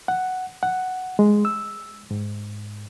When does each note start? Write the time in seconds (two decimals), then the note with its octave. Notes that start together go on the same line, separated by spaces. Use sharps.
0.08 F#5
0.63 F#5
1.19 G#3
1.45 E6
2.11 G#2